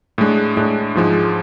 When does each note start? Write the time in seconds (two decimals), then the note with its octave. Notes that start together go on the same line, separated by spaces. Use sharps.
0.18 A2 G#3 D4
0.57 A2 G#3 D4
0.95 G#2 F3 G#3